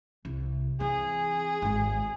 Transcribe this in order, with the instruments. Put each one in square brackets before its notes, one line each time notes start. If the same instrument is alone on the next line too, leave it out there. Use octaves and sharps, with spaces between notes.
[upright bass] C2
[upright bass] E3 C4 [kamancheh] G#4
[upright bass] G#1 G#3